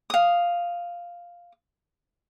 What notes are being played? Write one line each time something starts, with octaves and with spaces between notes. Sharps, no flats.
F5 D#6